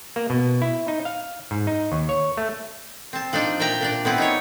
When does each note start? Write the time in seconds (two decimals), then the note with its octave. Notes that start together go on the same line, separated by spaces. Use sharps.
0.16 A#3
0.30 B2
0.62 E4
0.88 D#4
1.05 F5
1.51 G#2
1.67 D#4
1.92 D#2
2.09 C#5
2.37 A3
3.13 C4 A5
3.33 F3 D4 D#4 D5
3.60 A#2 D5 E5 G5 A#5
3.81 A#2 D4 D5
4.05 B3 C4 E4
4.18 D#4 C#5